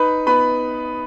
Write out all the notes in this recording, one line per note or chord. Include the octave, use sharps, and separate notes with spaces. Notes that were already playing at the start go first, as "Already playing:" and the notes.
Already playing: D#4 B4 B5
B3 B4 B5